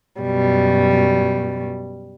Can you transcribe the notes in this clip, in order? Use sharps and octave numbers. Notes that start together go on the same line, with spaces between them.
F#2 B2 G3